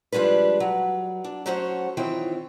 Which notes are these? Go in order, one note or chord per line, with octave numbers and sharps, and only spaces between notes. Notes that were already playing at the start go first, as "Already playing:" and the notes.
F3 G3 G#3 D4 B4
F#3
D4
F#3 A3 C#4 F#4 C5 C#5
D#3 E3 C4 F4 C#5 G5